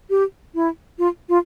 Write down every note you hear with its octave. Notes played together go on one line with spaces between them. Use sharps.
G4
E4
F4
F4